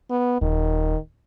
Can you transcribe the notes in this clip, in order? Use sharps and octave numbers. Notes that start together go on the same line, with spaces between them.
B3
D#1 D#3